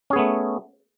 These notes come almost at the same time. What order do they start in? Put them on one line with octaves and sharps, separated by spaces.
C#4 G#4 B3 A3